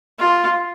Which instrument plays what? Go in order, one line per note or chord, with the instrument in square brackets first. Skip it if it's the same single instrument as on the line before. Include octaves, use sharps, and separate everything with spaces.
[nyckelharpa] F4